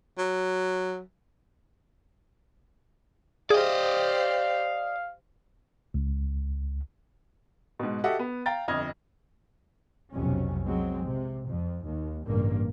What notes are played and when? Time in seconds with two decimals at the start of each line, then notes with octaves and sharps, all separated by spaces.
0.18 F#3
3.50 G4 G#4 C5 D5 D#5 F5
5.94 C#2
7.80 G#2 B2
8.04 F#4 G4 A4 D#5 E5 F#5
8.19 B3
8.46 F5 G5 A#5 A6
8.68 G1 F2 D#5 F6 G#6
10.12 B1 F2 C3 C#4
10.65 F#3 G#3 C4
11.06 C3
11.47 F2
11.86 D#2
12.26 A1 G2 C#3 A#3